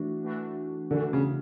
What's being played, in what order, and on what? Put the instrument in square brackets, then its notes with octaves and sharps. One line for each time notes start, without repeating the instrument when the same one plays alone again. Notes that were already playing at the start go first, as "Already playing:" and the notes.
Already playing: [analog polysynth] E3 A3 D4 F#4
E3 A3 D4 F#4
[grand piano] D3 [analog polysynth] E3 A3 D4 F#4
[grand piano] C#3